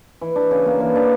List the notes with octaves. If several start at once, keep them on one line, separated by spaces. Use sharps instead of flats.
E3
D4
C#3
A#3
E3
D4